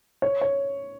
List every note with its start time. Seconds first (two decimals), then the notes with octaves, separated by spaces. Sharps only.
0.22 C#5
0.41 C#5